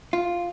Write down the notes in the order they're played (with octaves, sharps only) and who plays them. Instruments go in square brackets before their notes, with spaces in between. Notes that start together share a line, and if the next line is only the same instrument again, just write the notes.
[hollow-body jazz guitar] F4